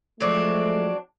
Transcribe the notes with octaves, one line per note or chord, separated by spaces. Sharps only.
F3 F#3 G#3 A3 C4 D4